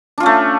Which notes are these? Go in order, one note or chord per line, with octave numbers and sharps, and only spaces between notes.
A3 C#4 D4 F4